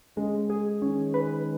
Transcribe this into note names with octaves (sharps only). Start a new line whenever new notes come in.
C#3 G#3
G#4
D#3 C#4
B4